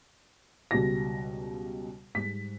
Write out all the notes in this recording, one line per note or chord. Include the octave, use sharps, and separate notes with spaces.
C#2 B2 G3 A#6
G#2 G3 B6